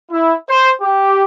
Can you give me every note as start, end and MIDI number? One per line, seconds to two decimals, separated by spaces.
0.11 0.34 64
0.48 0.70 72
0.81 1.24 67